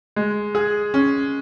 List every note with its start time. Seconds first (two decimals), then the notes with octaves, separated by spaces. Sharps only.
0.16 G#3
0.55 G#4
0.94 C#4